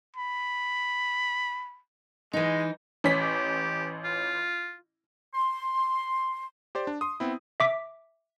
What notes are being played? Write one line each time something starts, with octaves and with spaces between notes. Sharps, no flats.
B5
E3 G#3 D#4
A1 C#4 B6
G4
F4
C6
G4 C5 D5
D4
C6 D#6
B3 C4 E4
E5 D6 B6